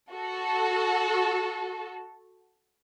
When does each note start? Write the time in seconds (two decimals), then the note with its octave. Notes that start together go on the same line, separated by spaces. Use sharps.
0.12 F#4 A4